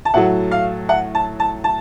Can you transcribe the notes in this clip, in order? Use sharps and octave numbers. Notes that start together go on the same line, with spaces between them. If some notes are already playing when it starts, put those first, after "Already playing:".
A5
A2 F#3 A3 F#5
F5
F#5
A5
A5
A5